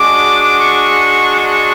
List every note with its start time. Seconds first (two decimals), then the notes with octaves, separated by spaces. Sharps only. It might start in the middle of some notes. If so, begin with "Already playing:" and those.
Already playing: G#3 D4 F#4 D6
0.61 C#6
1.37 C#6